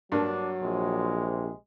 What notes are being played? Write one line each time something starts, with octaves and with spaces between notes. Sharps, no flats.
G2 F#3 A#3 D4
A#1 C3 G#3